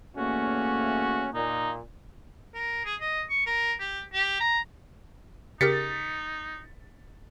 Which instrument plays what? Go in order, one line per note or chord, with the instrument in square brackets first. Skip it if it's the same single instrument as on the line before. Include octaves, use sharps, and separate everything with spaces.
[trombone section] E2 C#4 [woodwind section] A3 A#3 [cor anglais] F#4
[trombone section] A#2 [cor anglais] D#4
[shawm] A#4
G#4
D#5
C#6
A#4
G4
G4
A#5
[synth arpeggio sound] C#3 G4 A#4 [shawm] D#4 [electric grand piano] A6 B6 C#7